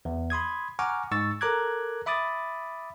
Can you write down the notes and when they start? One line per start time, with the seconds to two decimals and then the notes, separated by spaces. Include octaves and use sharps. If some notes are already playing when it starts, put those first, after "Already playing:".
0.05 E2
0.30 B5 C6 D#6 G#6
0.79 F#5 G#5 A#5 C#6 D6 F6
1.11 G#2 C#6 E6 A6
1.41 A4 A#4 A#5 D6 F#6 G#6
2.06 E5 B5 D6 D#6 A6